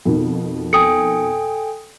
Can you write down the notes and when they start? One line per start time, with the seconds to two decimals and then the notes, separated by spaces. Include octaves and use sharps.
0.05 F2 B2 D#3
0.73 A4 G5 G#5 D#6 C#7